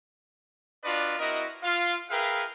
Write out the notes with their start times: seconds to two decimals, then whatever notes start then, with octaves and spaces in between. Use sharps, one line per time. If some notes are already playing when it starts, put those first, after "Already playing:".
0.84 D4 F4 F#4 B4 D5 D#5
1.19 C4 E4 F#4 A#4 D#5
1.63 F4 F5
2.10 G#4 A#4 B4 E5 F5 G5